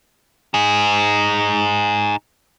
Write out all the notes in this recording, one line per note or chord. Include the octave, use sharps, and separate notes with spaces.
D#4 G#4